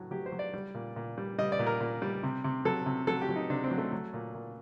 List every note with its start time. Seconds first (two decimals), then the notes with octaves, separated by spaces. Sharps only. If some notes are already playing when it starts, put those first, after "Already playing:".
Already playing: A2 F#3
0.11 F#3 G4
0.26 C5
0.32 F#3
0.39 D5
0.53 G3
0.74 A#2
0.96 A#2
1.18 G3
1.38 G3 D#5
1.52 D5
1.59 A#2
1.66 A#4
1.80 A#2
2.02 G3
2.23 C3
2.44 C3
2.65 F#3 A4
2.86 C3
3.07 F#3 A4
3.21 G4
3.29 F#3
3.36 D#4
3.50 C3 D4
3.64 C4
3.71 F#3
3.78 A3
3.93 F#3
4.14 A#2
4.35 A#2